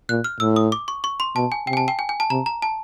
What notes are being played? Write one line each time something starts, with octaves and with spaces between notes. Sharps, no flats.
A#2 F#6
F6
A2 E6
D#6
D6
C#6
C#6
C6
B2 A5
G#5
C3 G5
G#5
A5
G5
G#5
G#5
A5
C3 A#5
A#5
A5